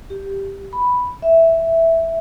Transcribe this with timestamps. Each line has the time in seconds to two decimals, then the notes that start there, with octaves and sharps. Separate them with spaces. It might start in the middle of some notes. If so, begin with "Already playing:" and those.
0.10 G4
0.73 B5
1.22 E5